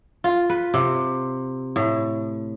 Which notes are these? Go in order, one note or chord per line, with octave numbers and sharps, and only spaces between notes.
F4
B4
C3
A2